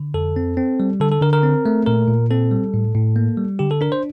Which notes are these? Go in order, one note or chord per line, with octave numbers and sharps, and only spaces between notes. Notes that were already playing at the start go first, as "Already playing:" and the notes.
Already playing: D3
F2 A4
C4
C4
G3
D3 A4
A4
D3 A#4
A#4
C4
A3
A#2 A#4
A#2
C4 A4
G3
A2
A2
A#3
G3
D3 G4
A4
D4 A#4
C5